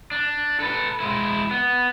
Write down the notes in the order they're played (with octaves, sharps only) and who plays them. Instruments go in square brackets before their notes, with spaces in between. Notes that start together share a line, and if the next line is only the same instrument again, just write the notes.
[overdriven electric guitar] D4
A4 B4
G#3 E4
B3